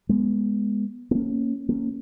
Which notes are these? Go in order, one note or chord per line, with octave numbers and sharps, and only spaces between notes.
G#3 B3
B3
A#3 C#4
A#3 C#4